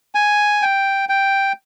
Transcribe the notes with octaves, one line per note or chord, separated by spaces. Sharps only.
G#5
G5
G5